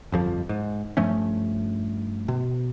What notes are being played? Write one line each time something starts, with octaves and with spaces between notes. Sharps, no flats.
G1 F2 F3
G#2
G2 F3 A3 C#4
B2